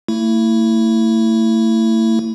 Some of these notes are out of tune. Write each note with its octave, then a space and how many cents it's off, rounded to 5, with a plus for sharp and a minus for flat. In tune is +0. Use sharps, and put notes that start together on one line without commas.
A3 +40 E4 +0